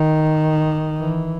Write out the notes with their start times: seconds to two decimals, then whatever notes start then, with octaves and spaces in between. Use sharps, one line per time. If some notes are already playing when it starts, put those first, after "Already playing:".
Already playing: D#3
0.99 E3